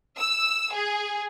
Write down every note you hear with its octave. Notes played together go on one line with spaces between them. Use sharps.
E6
G#4